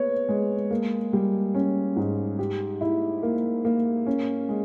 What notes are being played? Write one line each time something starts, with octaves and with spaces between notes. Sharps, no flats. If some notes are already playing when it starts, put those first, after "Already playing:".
Already playing: B3 C#5
G#3
A#3
G3
C#4
G#2
G4
E4
A#3
A#3
C#4
G#3